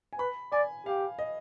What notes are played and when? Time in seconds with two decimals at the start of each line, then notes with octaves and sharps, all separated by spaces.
0.13 G#5
0.18 B4 B5
0.52 D5 G#5
0.86 G4 F5
1.19 D#5